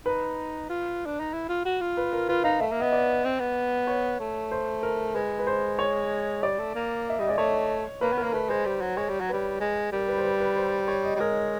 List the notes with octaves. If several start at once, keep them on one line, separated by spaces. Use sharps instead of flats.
D#4 B4
F4
D4
D#4
E4
F4
F#4
F4
B4
A#4
F4 B4
D#4 F5
A3 E5
A#3
B3 D#5
D5
C4
B3
C#5
A3
C5
A#4
G#3 B4
B4
C5
C#5
G3 D5
A3
A#3
E5
G3 D#5
G#3 D5
A3 C#5
A#3 B4
B3
A#4
A#3
A3 B4
G#3 C5
G3
F#3
G#3 C#5
G3
F#3
G3 B4
G#3
G3 A#4
B4
C5
B4
B4
C5
C#5
D#5
G3
G#3 A#4